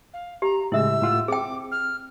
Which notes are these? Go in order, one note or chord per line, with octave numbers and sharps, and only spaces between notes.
F5
G4 A#5
A2 C#3 G#3 E4 E5 E6
A2 F4 F#5
C4 G#4 G5 D6
F6